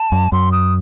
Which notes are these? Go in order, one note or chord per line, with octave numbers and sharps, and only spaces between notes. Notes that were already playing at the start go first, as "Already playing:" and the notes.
Already playing: A5
F#2
F#2 C6
D#6